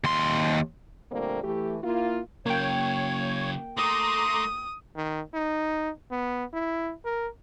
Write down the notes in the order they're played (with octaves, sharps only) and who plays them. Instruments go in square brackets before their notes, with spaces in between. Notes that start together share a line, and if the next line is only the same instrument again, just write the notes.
[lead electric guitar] D#2 C6
[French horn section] A#2 D3 G3 A3 A#3 C4
E3 A3 G4
A#3 E4 F4
[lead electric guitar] C#3 F#3 [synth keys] A#3 G5 [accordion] C#5
[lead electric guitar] A3 [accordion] A#5 C6 D6 [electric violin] D#6
[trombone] D#3
D#4
B3
E4
A#4